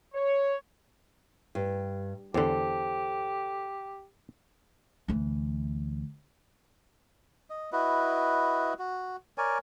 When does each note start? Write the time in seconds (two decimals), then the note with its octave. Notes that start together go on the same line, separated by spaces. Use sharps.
0.14 C#5
1.55 G2
2.34 E2 D3 G4 A4 C5
5.08 D2 E3
7.50 D#5
7.72 E4 F#4 B4 D#5
8.79 F#4
9.38 A#4 C#5 D5 G#5